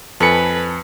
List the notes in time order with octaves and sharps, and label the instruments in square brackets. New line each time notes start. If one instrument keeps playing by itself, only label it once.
[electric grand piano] F2 C#7 [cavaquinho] A4 G#5 B5 [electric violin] B4